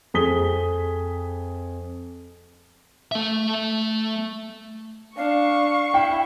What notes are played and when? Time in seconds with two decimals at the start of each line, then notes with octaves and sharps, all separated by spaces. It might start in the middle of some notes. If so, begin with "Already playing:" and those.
0.14 F2 G#4 D#6 B6 G7
3.12 A3 E5
5.17 D4 F5 C#6
5.94 E4 G5